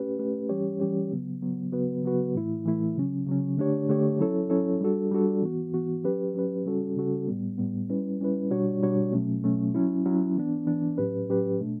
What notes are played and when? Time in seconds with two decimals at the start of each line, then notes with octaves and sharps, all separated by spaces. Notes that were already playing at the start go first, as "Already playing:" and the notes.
Already playing: A3 C#4 G4 B4
0.19 A3 C#4 G4 B4
0.49 E3 G3 C#4 G4 C#5
0.80 E3 G3 C#4 G4 C#5
1.11 C#3 F#3 B3
1.41 C#3 F#3 B3
1.72 C#3 F#3 B3 F#4 B4
2.03 C#3 F#3 B3 F#4 B4
2.34 A2 E3 A3 E4
2.65 A2 E3 A3 E4
2.96 C#3 F#3 C#4
3.27 C#3 F#3 C#4
3.57 D3 A3 D4 G4 C#5
3.89 D3 A3 D4 G4 C#5
4.20 F#3 C#4 E4 A4 C#5
4.50 F#3 C#4 E4 A4 C#5
4.81 G3 D4 F#4 A4
5.11 G3 D4 F#4 A4
5.42 E3 B3 F#4
5.74 E3 B3 F#4
6.04 F#3 C#4 G4 B4
6.35 F#3 C#4 G4 B4
6.65 C#3 G3 C#4 F#4 A4
6.97 C#3 G3 C#4 F#4 A4
7.27 A2 G3 B3
7.58 A2 G3 B3
7.89 G3 C#4 E4 B4
8.21 G3 C#4 E4 B4
8.51 B2 G3 D4 F#4 C#5
8.83 B2 G3 D4 F#4 C#5
9.13 B2 F#3 A3 C#4
9.44 B2 F#3 A3 C#4
9.74 F#3 C#4 E4
10.06 F#3 C#4 E4
10.36 E3 B3 D4
10.66 E3 B3 D4
10.98 A2 F#3 C#4 G4 B4
11.28 A2 F#3 C#4 G4 B4
11.60 B2 A3 D4